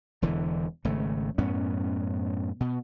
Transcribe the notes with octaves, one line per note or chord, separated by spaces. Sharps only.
E1 E2 D3 E3
G#1 C#3 A3
F#2 A2 B3 C#4
B2